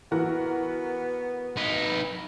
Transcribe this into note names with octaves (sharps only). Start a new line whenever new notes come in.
E3 B3 F#4 A#4 F#5
D#4 B4